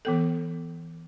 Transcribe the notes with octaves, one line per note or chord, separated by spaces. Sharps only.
E3 B3 A4